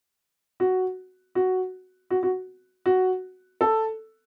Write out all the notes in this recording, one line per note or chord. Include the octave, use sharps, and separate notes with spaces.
F#4
F#4
F#4
F#4
F#4
A4